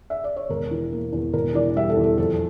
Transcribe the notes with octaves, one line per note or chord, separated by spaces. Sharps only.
E5
D5
C#5
E1 A#4
E3
A#3
E2
E1 A#4
E3 D5
G3 E5
A4
E2
A4
F2 A4